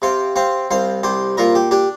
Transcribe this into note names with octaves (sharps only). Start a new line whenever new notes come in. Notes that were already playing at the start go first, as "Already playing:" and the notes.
C3 C5 F5
C4 C5 F5
C2 C5 F5
C2 G4 C5
A#2 F4 A#4
G4
D4 G4